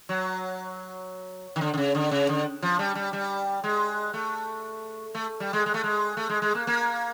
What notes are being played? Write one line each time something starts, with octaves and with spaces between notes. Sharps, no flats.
F#3
D#3
D3
D3
C#3
D3
C#3
D3
F3
G3
G3
G3
G#3
A3
A3
G3
G#3
G#3
A3
G#3
A3
G#3
G#3
A#3
A#3